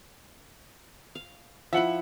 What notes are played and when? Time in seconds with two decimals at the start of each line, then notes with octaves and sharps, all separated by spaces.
1.15 F5
1.73 F3 E4 E5 F#5 F#7